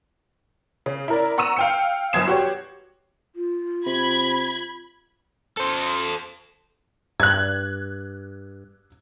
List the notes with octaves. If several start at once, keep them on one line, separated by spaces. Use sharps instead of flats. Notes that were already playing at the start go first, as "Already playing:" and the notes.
C#3
E4 A#4 D5
F#5 A#5 C#6 E6 D#7 E7
F5 G5 C#7
G1 F#2 D#6 G#6 C7 E7
F#4 G4 C#5
F4
C3 B5 G#6
A4 C5
G2 F#6 G#6